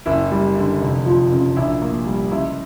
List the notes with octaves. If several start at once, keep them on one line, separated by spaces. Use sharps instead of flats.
F#1 E4
G3
D3
F1
F3
C#3
A#1 E4
A#3
G3
C#2 E4